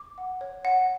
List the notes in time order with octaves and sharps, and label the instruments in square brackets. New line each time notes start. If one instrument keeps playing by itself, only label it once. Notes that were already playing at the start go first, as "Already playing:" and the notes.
Already playing: [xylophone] D6
F#5
C#5
F#5